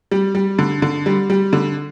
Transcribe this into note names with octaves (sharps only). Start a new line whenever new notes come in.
G3
G3
D3
D3
G3
G3
D3